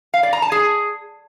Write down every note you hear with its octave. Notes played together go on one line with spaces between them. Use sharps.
F5
D5
A#5
A5
G#4